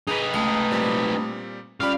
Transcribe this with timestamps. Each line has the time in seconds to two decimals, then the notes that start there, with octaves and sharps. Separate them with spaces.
0.07 D#4 G#4 B4
0.34 C#2 A3 D#6
0.71 A#2 G3 C4
1.80 G3 C#4 F4 G4 D5 F5 B5